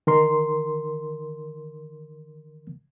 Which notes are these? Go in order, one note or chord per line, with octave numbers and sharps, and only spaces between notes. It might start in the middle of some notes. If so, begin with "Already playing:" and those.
D#3 A#4 C6